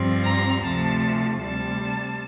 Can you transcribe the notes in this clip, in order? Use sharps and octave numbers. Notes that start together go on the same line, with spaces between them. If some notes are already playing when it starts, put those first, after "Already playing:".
Already playing: G2 F3 C4
A#5
D2 C3 F3 A3 A5
D2 C3 G3 A5